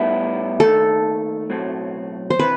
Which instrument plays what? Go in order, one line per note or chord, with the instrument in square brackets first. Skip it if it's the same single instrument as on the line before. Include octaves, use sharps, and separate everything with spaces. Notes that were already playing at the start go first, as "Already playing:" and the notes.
Already playing: [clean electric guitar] A2 G3 B3 E4
[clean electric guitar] D#2 D#3 A3 [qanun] A4
[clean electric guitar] B1 A2 F#3 C4
[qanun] C5
[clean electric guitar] C3 E3 [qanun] B4